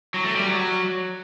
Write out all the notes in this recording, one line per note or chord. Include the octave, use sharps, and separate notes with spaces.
F#3
A3
G3
F#3